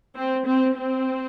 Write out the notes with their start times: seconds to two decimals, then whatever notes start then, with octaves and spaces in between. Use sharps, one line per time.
0.15 C4
0.45 C4
0.74 C4